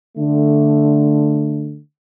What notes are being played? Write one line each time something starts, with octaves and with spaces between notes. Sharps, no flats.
D3 A3